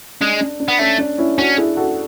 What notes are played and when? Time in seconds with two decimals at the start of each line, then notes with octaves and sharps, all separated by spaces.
0.20 G#3 D4
0.40 D4
0.60 D4
0.68 B3
0.79 A3 C#4
0.98 D4
1.18 C#4 E4
1.37 C#4 D4 F#4
1.57 E4 G#4
1.77 F#4 A4